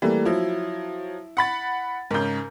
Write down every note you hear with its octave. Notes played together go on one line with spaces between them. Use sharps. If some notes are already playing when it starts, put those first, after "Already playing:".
E3 G3 A3 A#3
F3 F#3 E4
F#5 B5 A6
G#2 C#3 A#4 G6